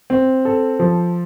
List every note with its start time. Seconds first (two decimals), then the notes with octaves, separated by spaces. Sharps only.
0.10 C4
0.45 A4
0.79 F3